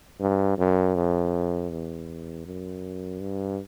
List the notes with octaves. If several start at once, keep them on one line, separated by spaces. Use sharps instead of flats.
G2
F#2
F2
E2
F#2
G2